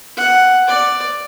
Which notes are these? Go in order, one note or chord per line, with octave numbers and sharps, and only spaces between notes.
F#5
D5